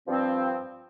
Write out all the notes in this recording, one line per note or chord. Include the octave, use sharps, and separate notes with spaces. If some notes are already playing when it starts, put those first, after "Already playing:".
G2 F3 C4